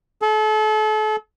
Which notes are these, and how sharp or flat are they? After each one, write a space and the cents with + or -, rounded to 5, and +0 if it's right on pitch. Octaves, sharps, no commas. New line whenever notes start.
A4 -35